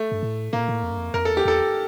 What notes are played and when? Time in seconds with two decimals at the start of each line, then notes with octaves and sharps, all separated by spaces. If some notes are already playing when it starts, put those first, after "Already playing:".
Already playing: A3
0.12 G2
0.23 A2
0.53 A2 A#3
0.61 A#2
0.69 A2
0.83 F2
0.91 G2
0.98 F2
1.14 F2 A#4
1.25 E2 A4
1.37 G4
1.45 E2 A4